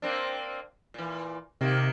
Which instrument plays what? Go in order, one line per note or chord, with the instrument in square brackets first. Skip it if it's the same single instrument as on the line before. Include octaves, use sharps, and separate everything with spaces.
[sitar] A#3 C4 D4
A#2 E3
[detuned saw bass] C3 [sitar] D#3 A#3